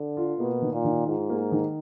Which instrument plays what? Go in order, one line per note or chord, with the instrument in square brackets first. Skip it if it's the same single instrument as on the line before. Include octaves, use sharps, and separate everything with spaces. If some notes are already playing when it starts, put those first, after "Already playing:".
Already playing: [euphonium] D3
[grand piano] F4
[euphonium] B2 [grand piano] A#3
[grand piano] D#3
[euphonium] A#2
[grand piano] D#3
[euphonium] G#2 [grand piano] F4
[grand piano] A#3
D#3